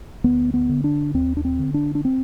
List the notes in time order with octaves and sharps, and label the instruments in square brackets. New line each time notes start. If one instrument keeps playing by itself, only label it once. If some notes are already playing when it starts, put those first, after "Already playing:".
[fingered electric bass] D2 B3
B3
D3
D4
D#2 C4
D4
C4
D3
D4
D4
C4